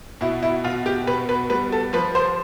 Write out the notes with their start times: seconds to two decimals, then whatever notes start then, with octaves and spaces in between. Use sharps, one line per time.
0.21 B2 E4
0.43 E4
0.64 B2 F4
0.86 G4
1.07 B2 B4
1.29 B4
1.50 G3 B4
1.72 A4
1.93 F3 B4
2.15 C5